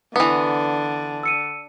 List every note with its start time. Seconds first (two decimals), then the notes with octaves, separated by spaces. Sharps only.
0.16 D3 E3 B3 B4
1.23 E6 C#7 D#7